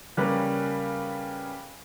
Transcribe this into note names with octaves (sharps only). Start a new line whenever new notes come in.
C#3 G3 A#3 C#4 A#4 B4